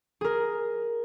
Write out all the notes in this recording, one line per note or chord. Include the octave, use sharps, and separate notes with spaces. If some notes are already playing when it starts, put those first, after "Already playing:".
G#4 A#4